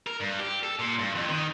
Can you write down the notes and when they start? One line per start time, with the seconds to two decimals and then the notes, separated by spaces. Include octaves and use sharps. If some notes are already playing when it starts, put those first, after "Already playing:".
0.07 A#4
0.20 G2
0.39 G4
0.63 A4
0.79 A#2
0.99 G2
1.15 F2
1.28 D#3